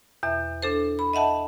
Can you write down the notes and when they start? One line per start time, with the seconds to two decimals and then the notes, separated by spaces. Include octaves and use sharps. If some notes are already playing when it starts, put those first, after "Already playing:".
0.23 E2 B2 E5
0.62 D4 A4 C5
0.99 B5
1.13 D#5 E5 F#5 A5